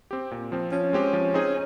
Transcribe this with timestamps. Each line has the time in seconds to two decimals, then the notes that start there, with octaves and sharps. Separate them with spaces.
0.11 C4 G4
0.31 A#2
0.52 F3 C4
0.72 F3 C#4
0.93 G#3 C4 G4
1.13 F3
1.34 C4 D#4 G#4